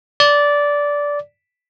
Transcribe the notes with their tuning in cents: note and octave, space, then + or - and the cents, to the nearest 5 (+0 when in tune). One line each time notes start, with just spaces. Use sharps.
D5 -15